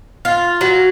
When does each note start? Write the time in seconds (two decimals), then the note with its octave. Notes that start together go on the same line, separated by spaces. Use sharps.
0.25 F4
0.61 F#3